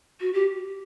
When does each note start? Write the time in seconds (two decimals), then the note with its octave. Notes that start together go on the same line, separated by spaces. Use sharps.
0.21 F#4
0.33 G4